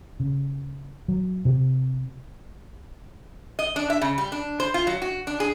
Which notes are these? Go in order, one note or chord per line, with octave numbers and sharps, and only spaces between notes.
C#3
F#3
C3
D#5
D4
E5
C#3
G3
D4
C5
F4
F#3
F#4
D4
G#4